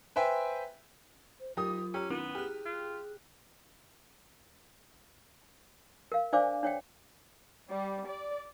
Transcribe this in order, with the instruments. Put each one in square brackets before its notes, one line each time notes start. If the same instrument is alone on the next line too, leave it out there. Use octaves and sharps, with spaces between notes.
[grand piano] B4 C5 E5 G5 G#5
[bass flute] C5
[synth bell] F#3 A#4 D6 [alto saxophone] D#4 [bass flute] F4 [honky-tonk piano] G4 D#6
[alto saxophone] C#4 [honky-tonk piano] G4 [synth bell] A#5 E6
[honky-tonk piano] D#3 [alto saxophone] B3 [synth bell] C#4 E4 D#7
[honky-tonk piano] G4 [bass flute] G#4 [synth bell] F6 F#6
[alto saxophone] F4
[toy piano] A#4 F5
D4 C5 D5 F5 G#5 D6
D4 C#5 F#5 G5
[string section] G3
D5